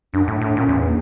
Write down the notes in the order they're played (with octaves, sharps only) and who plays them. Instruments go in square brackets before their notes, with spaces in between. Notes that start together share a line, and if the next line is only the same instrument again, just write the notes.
[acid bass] F#2 [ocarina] D4
[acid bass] A2
A2
[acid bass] A#2 [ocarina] C#4
[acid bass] E2
[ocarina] A#3